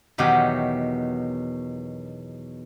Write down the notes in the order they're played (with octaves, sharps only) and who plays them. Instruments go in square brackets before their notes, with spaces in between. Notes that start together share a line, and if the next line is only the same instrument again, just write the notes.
[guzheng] E2 B2 D#3 F#3 G4 C#5